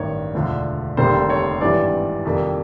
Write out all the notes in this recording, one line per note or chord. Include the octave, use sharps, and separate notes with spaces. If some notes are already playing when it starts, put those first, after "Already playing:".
Already playing: A1 G2 D#3 C#5
E1 D2 D3 F3
F1 D#2 D3 G3 A#3 C5
C#5
G#1 G2 E3 G3 D5
F2 C3 D#3 G3 A#3